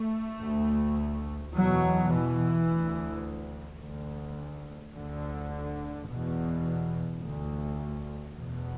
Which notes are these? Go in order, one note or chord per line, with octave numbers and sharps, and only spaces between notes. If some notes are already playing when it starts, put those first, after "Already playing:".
Already playing: A3
D2
E2 B2 F#3
E3
D2
D2
D2 D3
E2 B2
D2
E2 B2